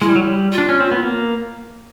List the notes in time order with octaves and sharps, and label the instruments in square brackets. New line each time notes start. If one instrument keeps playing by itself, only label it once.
[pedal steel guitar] G#3 [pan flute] E4
[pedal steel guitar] G3
F#3
G3
[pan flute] F4
[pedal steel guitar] D4
C#4
C4
B3
A#3